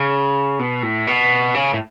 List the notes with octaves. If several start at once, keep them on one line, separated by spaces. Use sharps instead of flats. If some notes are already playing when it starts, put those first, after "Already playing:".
Already playing: C#3
B2
A2
B2
C#3
A2